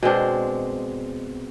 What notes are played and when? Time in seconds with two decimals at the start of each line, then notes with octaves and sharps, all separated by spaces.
0.03 B2 G#3 C4 D4